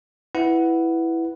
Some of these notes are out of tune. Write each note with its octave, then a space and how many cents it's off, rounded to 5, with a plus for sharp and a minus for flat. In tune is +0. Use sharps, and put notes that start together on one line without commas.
E4 +0 B4 +5 F#5 +0